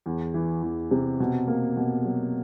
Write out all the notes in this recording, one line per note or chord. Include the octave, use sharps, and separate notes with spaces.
E2
E3
E2
C3
B2
A#3
B2
F#3